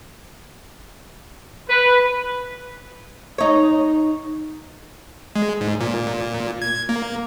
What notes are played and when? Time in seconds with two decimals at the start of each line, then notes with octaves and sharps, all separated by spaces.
1.68 B4
3.38 D#4 C#5
5.36 G#3
5.61 G#2
5.80 A#2
6.62 G#6
6.89 A#3